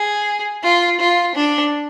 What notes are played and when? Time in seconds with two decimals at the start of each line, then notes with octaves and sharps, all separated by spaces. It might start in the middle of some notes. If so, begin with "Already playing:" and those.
Already playing: G#4
0.63 F4
1.00 F4
1.35 D4